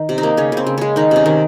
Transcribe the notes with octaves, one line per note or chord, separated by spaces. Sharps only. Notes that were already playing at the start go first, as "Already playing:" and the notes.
Already playing: D#3
C3
D#4
A#3
C#3 C#4
C#3 C4
C#3
G#3 C#4
D#3 D#4
C3 C#4
D#3